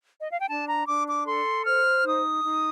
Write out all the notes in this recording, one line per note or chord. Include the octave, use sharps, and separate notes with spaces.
D#5
F5
G5
D4 A5
A#5
D4 D6
D6
A4 C6
C5 F6
D#4 D#6
D#4